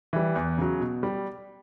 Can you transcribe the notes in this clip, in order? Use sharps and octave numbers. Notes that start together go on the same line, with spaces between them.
E3 G3
E2
C#3 F#3
B2
G3